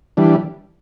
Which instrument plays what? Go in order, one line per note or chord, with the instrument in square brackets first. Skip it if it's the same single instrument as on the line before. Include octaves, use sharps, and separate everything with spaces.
[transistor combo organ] E3 G3 D4